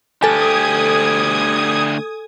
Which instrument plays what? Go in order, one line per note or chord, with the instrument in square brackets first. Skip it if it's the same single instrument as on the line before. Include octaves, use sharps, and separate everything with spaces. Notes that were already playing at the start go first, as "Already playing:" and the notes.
[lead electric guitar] D2 G4 [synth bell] A4 G#5 [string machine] D#6 G#6